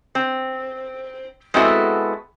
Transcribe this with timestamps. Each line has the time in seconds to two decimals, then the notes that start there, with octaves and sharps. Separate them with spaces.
0.15 C4
1.54 G#3 B3 C4 E4 F#4 A4